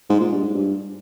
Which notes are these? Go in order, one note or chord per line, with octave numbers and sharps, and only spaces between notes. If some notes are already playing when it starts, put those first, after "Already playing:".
G#2
A#2
G2
G#2
G2